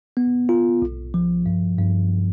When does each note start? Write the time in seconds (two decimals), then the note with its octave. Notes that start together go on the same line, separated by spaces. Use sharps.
0.17 B3
0.49 F4
0.82 B1
1.14 F3
1.46 G2
1.79 G2